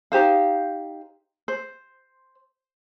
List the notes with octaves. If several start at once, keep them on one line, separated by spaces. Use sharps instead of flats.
D#4 G4 C5 F5
C5